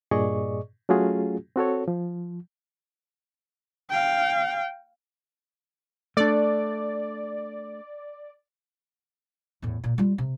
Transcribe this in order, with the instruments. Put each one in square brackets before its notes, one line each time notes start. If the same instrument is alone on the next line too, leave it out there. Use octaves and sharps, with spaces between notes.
[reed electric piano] G2 A#2 G#4 D5 D#5 C#6
F#3 A3 C#4 F4 F#4 G#4
C4 F#4 A4 C#5
F3
[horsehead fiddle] F5 G5
[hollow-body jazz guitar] A3 D4 [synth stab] D5
[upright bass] E2 A2
A#2
G3 F4
C3